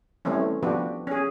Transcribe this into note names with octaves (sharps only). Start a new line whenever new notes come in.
E3 G3 A3 C4 C#4
F3 B3 D4 F#4 G4
C#4 G#4